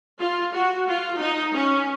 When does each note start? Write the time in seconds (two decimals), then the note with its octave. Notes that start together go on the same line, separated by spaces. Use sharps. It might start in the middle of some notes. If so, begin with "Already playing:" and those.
0.20 F4
0.54 F#4
0.87 F4
1.19 D#4
1.53 C#4